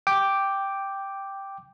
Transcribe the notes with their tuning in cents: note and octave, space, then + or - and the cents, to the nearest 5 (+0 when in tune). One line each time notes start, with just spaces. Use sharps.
G5 +0 D6 +0